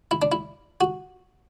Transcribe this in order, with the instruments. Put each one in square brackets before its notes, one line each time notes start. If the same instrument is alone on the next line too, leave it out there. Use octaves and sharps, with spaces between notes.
[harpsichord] E4
D4
E4
F#4